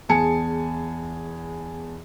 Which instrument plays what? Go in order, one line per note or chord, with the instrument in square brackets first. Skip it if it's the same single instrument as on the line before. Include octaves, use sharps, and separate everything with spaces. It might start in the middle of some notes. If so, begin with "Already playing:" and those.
[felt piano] E2 G#4 G#5 A5 C#7